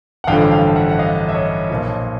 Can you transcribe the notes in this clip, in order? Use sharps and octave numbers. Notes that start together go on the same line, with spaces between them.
F#5
A1 G2 D3 F3 F5 G5
F5 G5
E5 F#5
F#5
D#5 F5
E5
C#5 D#5
B1 A#2 F3